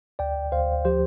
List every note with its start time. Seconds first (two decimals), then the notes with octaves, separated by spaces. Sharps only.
0.19 D2 D5 G5
0.52 D2 C5 F5
0.85 F3 G4 C5